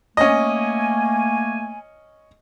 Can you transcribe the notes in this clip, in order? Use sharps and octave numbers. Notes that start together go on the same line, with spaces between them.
A3 A#3 C#4 D#5 G#5